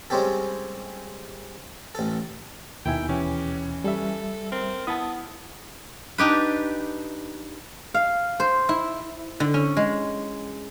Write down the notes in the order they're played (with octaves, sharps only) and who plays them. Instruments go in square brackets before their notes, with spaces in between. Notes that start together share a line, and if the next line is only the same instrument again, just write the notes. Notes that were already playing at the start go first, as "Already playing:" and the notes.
[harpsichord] G3 G#3 C4 C#4 G4 A4
A1 A4
[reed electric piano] D#2 B2 G#5 [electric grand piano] D#3 E4 E5 [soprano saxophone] G5
[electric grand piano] E3 C#4 [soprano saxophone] G4
[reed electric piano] G3 E5 [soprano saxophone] A4
[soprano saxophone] C4 [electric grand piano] A#4 F6
[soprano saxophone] B3 [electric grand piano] E4 [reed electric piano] A5 D#6
[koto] D4 D#4 G4 B4
[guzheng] F5
C5
E4
D3
C#4
G#3